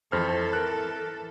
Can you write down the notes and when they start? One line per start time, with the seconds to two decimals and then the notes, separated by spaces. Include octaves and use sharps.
0.12 F2 E3 A4 C5 F6
0.53 A#4 F#6